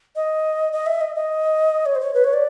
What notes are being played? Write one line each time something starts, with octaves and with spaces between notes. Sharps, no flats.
D#5
D#5
E5
D#5
D#5
C#5
C5
C#5
B4
C#5
D5